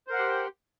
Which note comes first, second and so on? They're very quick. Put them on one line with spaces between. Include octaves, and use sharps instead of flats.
C5 A#4 F#5 C6 G4